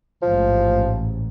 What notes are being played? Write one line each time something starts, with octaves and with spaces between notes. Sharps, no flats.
A1 G#2 F3